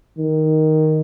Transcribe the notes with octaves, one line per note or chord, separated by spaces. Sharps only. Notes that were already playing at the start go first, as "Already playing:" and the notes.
D#3